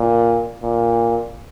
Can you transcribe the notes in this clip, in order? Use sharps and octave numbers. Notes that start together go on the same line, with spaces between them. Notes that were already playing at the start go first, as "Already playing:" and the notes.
Already playing: A#2
A#2